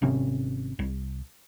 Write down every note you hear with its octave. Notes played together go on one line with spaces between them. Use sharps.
G#1 C3 C#4
C2